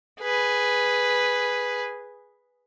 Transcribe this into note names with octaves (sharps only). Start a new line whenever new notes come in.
G#4 B4